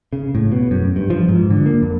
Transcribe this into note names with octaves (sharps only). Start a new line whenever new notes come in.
C#3
A2
B2
F#2
G2
F3
G#2
D3
A#3
F2